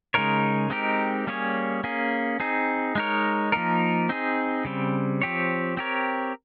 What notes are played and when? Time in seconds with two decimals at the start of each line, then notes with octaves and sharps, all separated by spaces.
0.14 C#3 G#3 D#4 A#4 C#5
0.70 G#3 C4 D#4 G4 A#4
1.27 G3 A#3 C#4 G#4 C#5
1.84 A#3 C#4 G#4
2.40 C4 D#4 G#4
2.95 G#3 D#4 A#4 C#5
3.52 F3 A#3 D#4 A#4
4.09 C4 D#4 G#4
4.65 C#3 G3 C4
5.22 F3 C4 G4 C#5
5.77 C4 G4 A#4 C#5